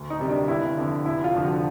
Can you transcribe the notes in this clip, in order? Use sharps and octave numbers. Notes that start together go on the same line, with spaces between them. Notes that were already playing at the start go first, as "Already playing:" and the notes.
Already playing: D2
D#4
C3 D#3 G3
D4
G1 E4
F2 D3
F1 E4
F4
F2 D3 F3
F#4